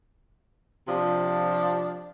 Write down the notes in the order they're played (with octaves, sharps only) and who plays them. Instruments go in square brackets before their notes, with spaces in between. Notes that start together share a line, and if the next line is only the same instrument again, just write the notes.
[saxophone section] C3 F3 D4 F4